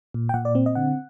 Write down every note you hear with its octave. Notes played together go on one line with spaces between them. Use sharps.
A#2
G5
A#2 F#5
D5
C4
D#5
D3 F#5